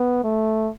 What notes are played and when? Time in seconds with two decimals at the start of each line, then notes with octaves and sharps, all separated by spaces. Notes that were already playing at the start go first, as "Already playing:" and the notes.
Already playing: B3
0.24 A3